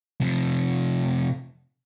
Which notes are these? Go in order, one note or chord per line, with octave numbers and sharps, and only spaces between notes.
C3 F3